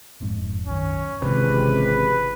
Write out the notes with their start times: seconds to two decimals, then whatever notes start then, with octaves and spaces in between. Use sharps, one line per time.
0.21 E1 F2 G#2
0.67 B1 F#2 D#3 C#4
1.22 G#1 C#2 C3 D#3 E3 B4